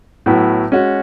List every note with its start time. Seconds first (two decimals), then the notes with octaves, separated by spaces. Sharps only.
0.26 A2 F#3 B3 E4
0.72 G#3 C#4 F#4